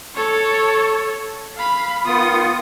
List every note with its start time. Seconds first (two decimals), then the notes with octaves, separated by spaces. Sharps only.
0.15 A4 C#5
1.58 F5 B5
2.06 D#3 B3 F4 D#6